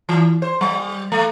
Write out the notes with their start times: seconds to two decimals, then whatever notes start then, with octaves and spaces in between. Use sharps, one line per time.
0.09 E3
0.42 C5
0.61 G3
1.12 A3